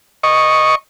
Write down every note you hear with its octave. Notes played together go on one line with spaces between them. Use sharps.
D#5 C#6